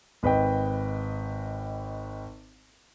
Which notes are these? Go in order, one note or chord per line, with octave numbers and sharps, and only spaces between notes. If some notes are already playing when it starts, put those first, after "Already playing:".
G#1 B4 D#5 G5